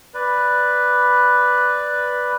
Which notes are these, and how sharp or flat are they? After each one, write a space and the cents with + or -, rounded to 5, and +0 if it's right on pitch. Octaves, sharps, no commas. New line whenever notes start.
B4 +0 D5 +0 B5 +0